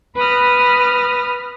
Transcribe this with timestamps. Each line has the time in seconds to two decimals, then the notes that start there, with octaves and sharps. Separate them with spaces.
0.17 B4 B5 D#6 F6 A#6